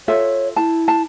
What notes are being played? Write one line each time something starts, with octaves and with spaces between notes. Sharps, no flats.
F4 A4 C#5 E5
E4 A5
A5